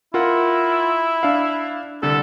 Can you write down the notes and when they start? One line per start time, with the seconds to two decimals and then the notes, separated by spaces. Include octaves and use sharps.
0.14 E4 F4 A#4 F#5
1.23 D4 F5
2.03 C2 D3 A4